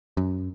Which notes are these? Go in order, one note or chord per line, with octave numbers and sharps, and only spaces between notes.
F#2